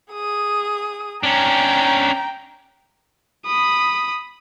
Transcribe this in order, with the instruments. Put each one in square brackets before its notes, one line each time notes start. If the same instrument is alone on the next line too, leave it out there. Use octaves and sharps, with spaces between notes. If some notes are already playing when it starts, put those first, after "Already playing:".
[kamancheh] G#4 D#6
[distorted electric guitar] C#4 D4 [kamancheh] G5 A#5
[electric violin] B5 D#6